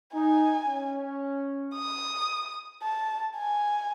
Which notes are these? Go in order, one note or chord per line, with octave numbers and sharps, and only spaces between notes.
D#4 G#5
C#4
D#6
A5
G#5